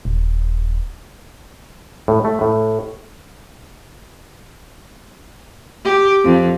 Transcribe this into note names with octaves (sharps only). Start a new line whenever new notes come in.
D#1
A2
A3
A2
G4
F2